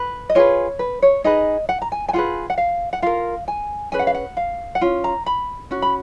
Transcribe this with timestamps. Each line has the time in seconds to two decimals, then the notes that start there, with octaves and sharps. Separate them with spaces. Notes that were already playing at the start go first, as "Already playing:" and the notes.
Already playing: B4
0.29 D#5
0.35 F4 G#4 B4 C#5
0.79 B4
1.02 C#5
1.24 D#4 G#4 B4 D#5
1.69 F#5
1.82 A#5
1.92 G#5
2.09 G#5
2.13 F4 G#4 B4 F#5
2.50 F#5
2.58 F5
2.93 F#5
3.02 F4 A#4 F5
3.48 G#5
3.92 C#4 G#4 B4 G#5
3.99 F#5
4.07 F5
4.14 F#5
4.37 F5
4.75 F#5
4.81 C#4 F4
5.04 A#5
5.26 B5
5.71 C#4 F#4
5.82 B5